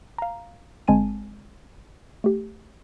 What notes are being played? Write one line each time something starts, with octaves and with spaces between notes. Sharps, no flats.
F5 A#5
G1 G#3 C4 G#5 A5 D#7
A3 G4